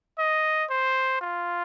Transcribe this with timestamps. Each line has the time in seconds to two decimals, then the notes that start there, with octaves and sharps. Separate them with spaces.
0.18 D#5
0.70 C5
1.21 F4